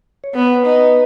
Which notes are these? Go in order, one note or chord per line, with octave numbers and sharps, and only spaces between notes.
C#5
B3 B4
D#4